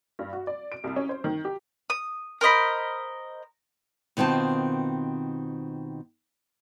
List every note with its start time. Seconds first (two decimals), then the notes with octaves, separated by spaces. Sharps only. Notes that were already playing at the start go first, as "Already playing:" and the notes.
0.19 G2
0.33 F#4
0.47 D5
0.72 D7
0.84 C2
0.96 C#4
1.09 C5
1.24 D#3
1.45 G4
1.90 D#6
2.41 A#4 C5 D#5 B5
4.17 B2 D#3 C4 F4 A5